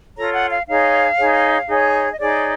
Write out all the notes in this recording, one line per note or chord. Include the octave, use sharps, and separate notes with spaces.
F4 A4 C#5 A#5
F#5
F5
D#4 G#4 C#5 F5
D#4 G#4 C#5
D#4 G#4 C#5
D#5
D#4 G#4 C#5 D5